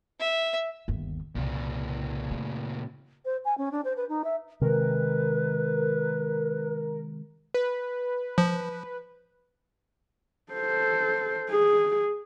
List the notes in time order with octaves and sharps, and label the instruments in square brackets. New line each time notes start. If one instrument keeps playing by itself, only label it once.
[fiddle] E5
[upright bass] G1 D#2
[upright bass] C2 [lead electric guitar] A#2 C#3
[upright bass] A3
[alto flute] C5
G#5
C#4
D4
C5
B4
D#4
E5
[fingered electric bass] C3 D#3 G#3 [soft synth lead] A#4 [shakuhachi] B4
[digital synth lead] B4
[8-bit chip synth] F3
[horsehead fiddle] A4 C5
G#4